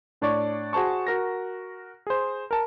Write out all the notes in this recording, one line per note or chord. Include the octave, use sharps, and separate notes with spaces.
A2 D4 C#5 D5 C#6
F#4 G#4 C5 A5 C#6
F#4 A#4 A#6
G#4 C5
A#4 A5